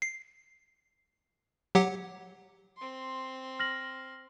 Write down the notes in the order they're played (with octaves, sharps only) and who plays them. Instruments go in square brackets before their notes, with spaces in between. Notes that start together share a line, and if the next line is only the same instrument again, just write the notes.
[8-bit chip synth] C7
F#3 G4 F#5
[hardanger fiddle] C4 C6
[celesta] F6 A#6 F#7